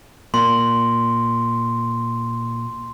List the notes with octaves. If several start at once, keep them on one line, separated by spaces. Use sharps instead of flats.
A#2 C6